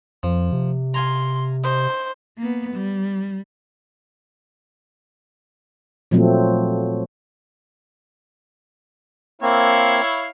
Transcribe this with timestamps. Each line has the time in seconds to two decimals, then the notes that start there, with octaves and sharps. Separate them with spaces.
0.23 F2 F3
0.53 C3
0.94 F5 G#5 A#5 C6
1.64 D#4 C5
2.38 A#3 B3
2.74 G3
6.11 A#2 F3 F#3 A3 C4
9.42 A#3 C4 E4 C#5 F5